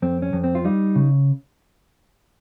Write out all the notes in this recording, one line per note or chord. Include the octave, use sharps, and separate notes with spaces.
F2 C4
C#4
F2
C4
F4
G3 D#4
C#3